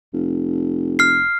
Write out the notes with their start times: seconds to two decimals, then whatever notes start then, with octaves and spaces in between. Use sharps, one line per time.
0.13 F1
0.99 F6 C7